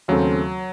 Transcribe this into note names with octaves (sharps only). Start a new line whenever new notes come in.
D#2 C#3 F#3 A3 C4